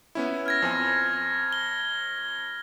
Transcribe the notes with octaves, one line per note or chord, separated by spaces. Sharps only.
B3 C#4 E4
F6 G#6 A#6
F2 C5 G#5
G7